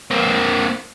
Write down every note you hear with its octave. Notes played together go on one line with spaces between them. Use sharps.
A#3 C4